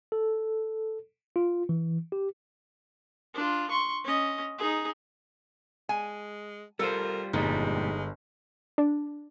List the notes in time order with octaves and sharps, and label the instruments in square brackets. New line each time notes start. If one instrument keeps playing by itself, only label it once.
[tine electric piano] A4
F4
E3
G4
[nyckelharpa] D4 F4
C6 C#6
C#4 D#5
D#4 G#4
[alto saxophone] G#3 [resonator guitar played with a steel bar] G#5
[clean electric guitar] G3 F4 C5 [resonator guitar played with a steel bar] A4 [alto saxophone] A#4
[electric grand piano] G1 [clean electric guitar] F2 A#2 G3 [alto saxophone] G#3 [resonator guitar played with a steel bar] D#4
[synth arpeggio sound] D4